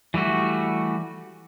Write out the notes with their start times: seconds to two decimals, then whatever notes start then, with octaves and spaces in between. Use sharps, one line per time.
0.14 E3 G3 A3 F#4